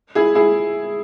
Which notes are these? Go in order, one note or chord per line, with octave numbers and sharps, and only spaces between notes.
E4 G#4
E4 G#4